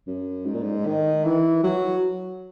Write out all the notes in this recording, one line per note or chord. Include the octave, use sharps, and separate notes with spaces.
F#2
G#2
A#2
G#2
D#3
E3
F#3